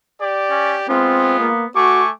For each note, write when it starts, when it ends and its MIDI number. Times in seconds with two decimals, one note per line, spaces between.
0.20 0.84 67
0.20 0.84 74
0.50 0.75 61
0.89 1.52 56
0.89 1.66 59
0.89 1.37 60
0.89 1.52 65
1.39 1.66 58
1.76 2.12 57
1.76 2.02 66
1.76 2.12 80
1.76 2.12 85
1.76 2.10 86